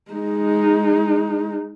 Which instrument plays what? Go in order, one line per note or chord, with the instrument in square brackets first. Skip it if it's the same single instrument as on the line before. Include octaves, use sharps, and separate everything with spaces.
[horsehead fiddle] G#3 D#4